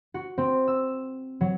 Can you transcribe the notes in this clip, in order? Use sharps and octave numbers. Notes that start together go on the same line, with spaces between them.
F#4
C4
E6
F#3